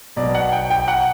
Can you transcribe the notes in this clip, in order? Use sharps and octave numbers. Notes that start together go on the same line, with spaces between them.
B2 F#3 B3 D5
F#5
G5
G5
F#5